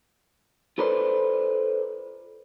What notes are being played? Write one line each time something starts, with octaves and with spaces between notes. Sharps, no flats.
F4 A4 B4 C5 D5